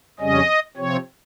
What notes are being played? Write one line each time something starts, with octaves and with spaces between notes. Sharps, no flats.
F2 C#3 G3 C#4 D#5
C3 F3 C4 C#5